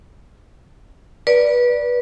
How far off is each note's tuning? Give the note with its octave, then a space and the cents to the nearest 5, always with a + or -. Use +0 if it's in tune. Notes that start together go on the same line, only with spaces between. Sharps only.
B4 -25 D5 +0